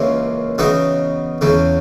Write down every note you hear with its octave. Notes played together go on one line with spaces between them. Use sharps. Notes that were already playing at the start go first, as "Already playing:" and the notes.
Already playing: C#2 C#3 E3 A#3
C#3 E3 B3 D#4 F#4
E2 C#3 E3